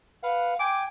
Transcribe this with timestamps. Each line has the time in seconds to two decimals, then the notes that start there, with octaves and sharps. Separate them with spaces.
0.23 B4 F5 F#5
0.60 G5 G#5 D6